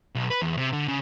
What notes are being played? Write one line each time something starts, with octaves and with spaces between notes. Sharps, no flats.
B1
B4
E2
C3
D3
C#3